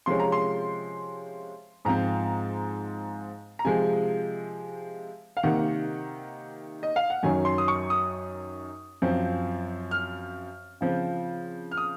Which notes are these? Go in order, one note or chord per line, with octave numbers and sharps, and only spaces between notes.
C3 F3 G#3 C#4 C6
A#5
C6
G#2 F3 C4 A#5
A#5
C3 F3 G#3 G#5
F5
C3 D#3 A#3 F#5
D#5
F5
F#5
F#2 D#3 F#3 C#4 G#5
C6
D#6
C#6
D#6
F#2 F3 C4
F6
C#3 F3 C4
F6
D#6